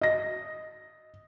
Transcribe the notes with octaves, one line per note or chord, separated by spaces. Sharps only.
D#5 A#6